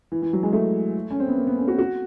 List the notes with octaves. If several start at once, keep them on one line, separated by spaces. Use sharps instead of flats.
E3
E3
F#3
G#3
A3
C#4
C4
B3
A#3
B3
C#4
F#4
F#4